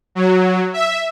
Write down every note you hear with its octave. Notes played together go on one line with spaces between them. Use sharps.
F#3
E5